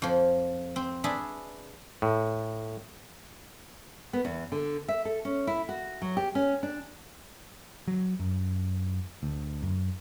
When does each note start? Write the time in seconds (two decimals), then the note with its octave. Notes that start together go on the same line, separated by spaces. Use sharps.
0.02 F2 F3
0.76 C4
1.04 D4 G#4 B4 E5 A5
2.02 A2
4.13 B3
4.25 E2
4.52 D3
4.88 E5
5.05 A4
5.25 C#4
5.47 E4
5.69 F#4
6.02 F#3
6.17 G4
6.35 C#4
6.63 D4
7.88 F#3
8.20 F#2
9.23 D2
9.63 F#2